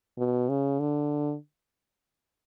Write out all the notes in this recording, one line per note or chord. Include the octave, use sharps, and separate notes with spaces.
B2
C#3
D3